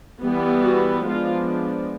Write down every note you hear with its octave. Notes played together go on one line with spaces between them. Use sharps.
E3 G3 B3
F#4
F3 G#3 B3 D4 F4